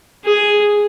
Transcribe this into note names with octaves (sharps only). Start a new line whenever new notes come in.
G#4